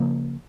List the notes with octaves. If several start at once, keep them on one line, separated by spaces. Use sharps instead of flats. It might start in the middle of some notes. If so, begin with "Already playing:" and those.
Already playing: C#3 F3 A#3